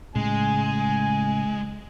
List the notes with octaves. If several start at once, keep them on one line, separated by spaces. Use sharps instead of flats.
A2 C#3 G#3 G#5